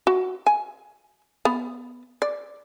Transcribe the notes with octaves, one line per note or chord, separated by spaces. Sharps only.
F#4
G#5
B3
D5